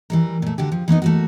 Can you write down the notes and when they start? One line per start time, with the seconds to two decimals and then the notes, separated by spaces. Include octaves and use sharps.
0.10 E3 G3 A#4
0.42 A#2 A3
0.58 D3 F#4 G4
0.72 F3
0.88 E3 A#3 B3 D#4
1.02 A3 A#3 F#4